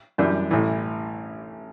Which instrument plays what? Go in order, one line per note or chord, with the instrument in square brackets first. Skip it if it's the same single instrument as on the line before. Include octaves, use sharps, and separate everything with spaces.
[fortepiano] F#2 E3 G3 D4
A1 A2 E3